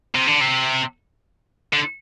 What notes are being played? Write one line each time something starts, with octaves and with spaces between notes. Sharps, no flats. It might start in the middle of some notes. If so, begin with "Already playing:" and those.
C3
D3
C3
D3